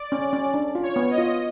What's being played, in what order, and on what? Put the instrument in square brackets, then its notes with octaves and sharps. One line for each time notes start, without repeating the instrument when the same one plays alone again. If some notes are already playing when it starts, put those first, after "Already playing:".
Already playing: [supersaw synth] D5
[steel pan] C#4
C#4
D4
F4
[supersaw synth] C#5
[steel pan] B3
[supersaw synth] D#5
[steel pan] F4